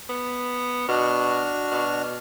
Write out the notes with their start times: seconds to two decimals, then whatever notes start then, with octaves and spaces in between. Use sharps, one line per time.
0.09 B3
0.88 B2 D4 F#4 F6
1.71 B2